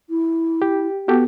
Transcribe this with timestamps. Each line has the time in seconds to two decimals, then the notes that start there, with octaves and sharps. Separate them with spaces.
0.10 E4
0.62 G4
1.08 B3 F#4 G4 A4